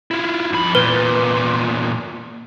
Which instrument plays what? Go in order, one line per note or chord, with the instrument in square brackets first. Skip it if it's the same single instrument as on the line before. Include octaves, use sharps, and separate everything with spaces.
[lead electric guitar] E4 F4
F2 B5
[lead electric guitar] E2 A#2 [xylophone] B4